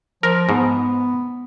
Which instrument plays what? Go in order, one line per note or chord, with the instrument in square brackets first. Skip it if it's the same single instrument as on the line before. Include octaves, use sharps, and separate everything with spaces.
[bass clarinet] F3 [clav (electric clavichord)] A#4
[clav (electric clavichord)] G#2 [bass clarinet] B3